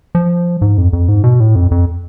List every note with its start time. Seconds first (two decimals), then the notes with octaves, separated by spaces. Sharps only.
0.15 F3
0.61 G#2
0.78 F2
0.93 F2
1.08 G#2
1.24 B2
1.40 A2
1.55 F2
1.71 F2